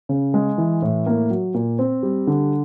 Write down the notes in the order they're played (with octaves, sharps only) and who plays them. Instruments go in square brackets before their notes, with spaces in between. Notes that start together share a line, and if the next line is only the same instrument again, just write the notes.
[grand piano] C#3
G#3
E3
A2
A#3
F#3
A#2
C4
G3
D3